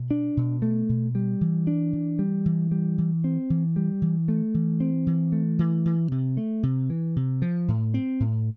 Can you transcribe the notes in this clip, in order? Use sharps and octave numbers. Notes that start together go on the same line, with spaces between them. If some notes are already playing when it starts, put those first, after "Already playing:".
Already playing: B2
D4
B2
A3
B2
G3
E3
D4
E3
G3
E3
G3
E3
C4
E3
G3
E3
A3
E3
C4
E3
A3
E3
E3
C3
A3
C3
E3
C3
F3
A2
C4
A2